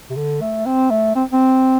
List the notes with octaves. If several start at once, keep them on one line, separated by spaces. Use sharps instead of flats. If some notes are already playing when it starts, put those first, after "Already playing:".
C3
D3
A3
C4
A3
C4
C4